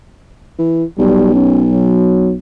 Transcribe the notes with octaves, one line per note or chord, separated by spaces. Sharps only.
E3
B1 G3
C#4
F#3